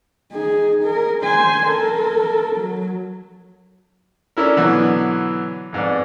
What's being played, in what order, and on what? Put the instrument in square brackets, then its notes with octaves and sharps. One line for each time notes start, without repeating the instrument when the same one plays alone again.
[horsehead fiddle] D#4 G#4
G#4 A#4
C5 G#5
A4 A#4
F#3
[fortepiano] C#4 D4 E4 A4 A#4
B2 D3 E3 F#3
F2 G#2 B3 D5